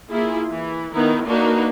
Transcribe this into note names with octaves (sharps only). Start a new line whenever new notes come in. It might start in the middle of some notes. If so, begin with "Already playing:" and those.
A#3 E4 F4 G#4
E3
D#3 B3 D#4 E4
A#3 D4 D#4 F#4 B4